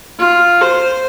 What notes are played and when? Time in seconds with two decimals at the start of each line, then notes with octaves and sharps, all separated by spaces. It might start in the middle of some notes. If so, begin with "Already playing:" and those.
0.19 F4
0.61 C5